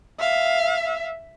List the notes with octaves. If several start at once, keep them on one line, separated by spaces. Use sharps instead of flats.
E5 F5